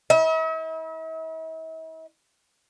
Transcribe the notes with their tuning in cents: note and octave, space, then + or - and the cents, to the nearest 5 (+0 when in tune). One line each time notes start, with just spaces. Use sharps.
E4 -40 E5 -45